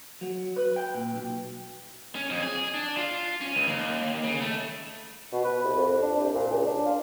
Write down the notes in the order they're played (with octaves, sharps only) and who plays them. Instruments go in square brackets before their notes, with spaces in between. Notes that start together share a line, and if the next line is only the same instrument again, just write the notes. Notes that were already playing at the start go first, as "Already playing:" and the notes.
[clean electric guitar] F#3
B4
G5
A#2
B1
[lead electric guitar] C#4
F2
G#4
D4
F4
C#4
C#2
D#2
C#3
A3
[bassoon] B2
B4
C2
F2
F2
D4
C2
A#2
C#2
D4
F4